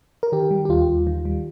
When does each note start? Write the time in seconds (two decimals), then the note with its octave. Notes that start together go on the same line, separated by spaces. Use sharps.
0.23 A#4
0.32 D#3 G4
0.51 G3
0.65 G4
0.69 D#2 F4
0.88 D#2
1.07 D#3
1.25 G3